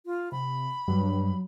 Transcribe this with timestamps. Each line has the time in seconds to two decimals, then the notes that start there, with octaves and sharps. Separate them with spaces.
0.06 F4
0.32 C3 B5
0.88 G2 F#3